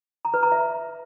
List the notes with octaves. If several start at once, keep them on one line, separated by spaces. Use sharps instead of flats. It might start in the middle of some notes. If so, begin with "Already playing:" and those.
A#5
B4
A#5
E5